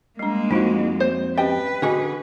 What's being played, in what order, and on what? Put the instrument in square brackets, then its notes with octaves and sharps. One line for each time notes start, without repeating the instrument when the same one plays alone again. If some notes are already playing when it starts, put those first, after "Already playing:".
[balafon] G3 D4 [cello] G#3 A#3
[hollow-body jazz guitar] F2 F#4 [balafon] D#4 F4
[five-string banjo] C5
[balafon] C#4 G4 D#5 [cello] B4 [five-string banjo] G5
[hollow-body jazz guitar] D3 G#4 [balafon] F#4 D#5